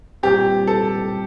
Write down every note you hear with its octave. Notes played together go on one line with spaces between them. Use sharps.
A#2 G3 C4 G4
A4